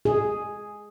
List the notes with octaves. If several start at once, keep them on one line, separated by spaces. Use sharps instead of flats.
G#4